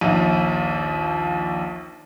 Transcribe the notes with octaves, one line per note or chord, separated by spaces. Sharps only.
A#1 D#2